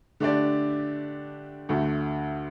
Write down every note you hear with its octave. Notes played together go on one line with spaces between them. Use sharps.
D3 A3 D4 G4 D5
D2 D3 A3